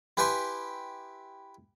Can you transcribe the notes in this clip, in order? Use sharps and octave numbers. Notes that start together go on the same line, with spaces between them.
E4 G4 B4 G5 G#5 C6